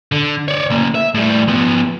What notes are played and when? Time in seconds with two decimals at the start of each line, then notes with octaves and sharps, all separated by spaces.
0.12 D3
0.48 C#5 D5
0.70 C#3 A#3
0.95 E5
1.15 A2 G3
1.48 F3 B3